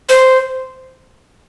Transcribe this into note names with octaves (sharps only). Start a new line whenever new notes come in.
C5